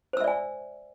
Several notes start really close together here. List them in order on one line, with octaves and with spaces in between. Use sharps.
C5 E6 E5 D5 G#5